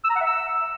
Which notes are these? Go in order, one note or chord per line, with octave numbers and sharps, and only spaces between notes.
E6
A#5
F#5
E5
E6